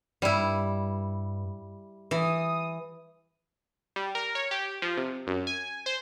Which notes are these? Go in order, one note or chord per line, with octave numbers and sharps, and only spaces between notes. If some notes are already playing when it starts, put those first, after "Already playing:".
G2 G3 E4
E3 D#6
G3
A#4
C#5
G4
F3
C3
F#2
G#5
C5